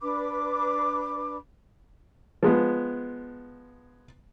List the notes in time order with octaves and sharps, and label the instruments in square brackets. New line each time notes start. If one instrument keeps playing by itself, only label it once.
[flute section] D4 B4 B5 D6
[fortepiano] F3 G#3 B3